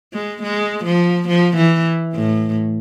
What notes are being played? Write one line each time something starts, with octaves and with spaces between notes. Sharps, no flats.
G#3
G#3
F3
F3
E3
A2